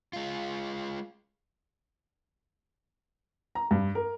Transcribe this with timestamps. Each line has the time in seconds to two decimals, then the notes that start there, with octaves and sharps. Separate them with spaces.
0.13 G#3 F4
3.55 A#5
3.71 G2
3.95 A#4